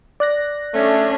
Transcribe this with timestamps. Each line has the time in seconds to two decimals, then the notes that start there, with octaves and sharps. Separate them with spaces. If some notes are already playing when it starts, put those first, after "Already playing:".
0.20 D5 F#6 A#6
0.74 A3 C#4 D4